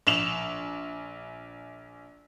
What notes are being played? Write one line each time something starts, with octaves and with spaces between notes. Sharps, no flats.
A#1 E7 F7